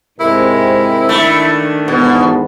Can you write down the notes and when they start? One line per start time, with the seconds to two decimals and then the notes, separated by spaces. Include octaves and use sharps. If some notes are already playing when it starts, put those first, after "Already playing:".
0.20 G#2 C3 G#3 C4 E4 A#4
1.09 D#3 A3 D4
1.88 E2 G#2 B2 B3